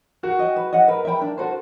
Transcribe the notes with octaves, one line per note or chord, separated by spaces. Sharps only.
F#4 A#4
D#5 G5
B4
D#5 F#5
A#4 B4
E5 G5 B5
D4
F#4 A4 C5